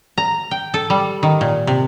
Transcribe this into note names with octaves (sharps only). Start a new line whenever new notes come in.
A#5
G5
A4
G3
D#3
A#2
C3